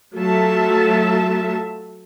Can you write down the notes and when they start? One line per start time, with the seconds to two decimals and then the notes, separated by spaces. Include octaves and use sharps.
0.15 F#3 A3 F4 A4 E5 A5